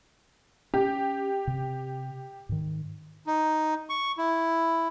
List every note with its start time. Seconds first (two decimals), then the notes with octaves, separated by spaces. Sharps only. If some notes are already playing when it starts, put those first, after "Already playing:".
0.74 C#4 G4
1.47 C3
2.49 G#2 D#3
3.27 D#4
3.90 C#6
4.18 E4